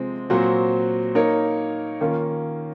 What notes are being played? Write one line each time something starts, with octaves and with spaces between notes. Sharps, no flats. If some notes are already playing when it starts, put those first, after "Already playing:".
Already playing: C3 F3 G#3 C4
A#2 F#3 C4 F#4 C5
A#3 D#4 A#4 C#5
D#3 A#3 C#4 F4